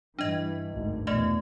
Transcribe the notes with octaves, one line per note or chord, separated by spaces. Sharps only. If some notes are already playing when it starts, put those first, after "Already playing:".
G2 E3 D4 D#5
G#1 D2 G2
A#1 E2 B2 A3 D#5